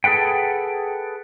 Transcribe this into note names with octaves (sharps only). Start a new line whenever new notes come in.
G#4 A4 B4 F#5 G5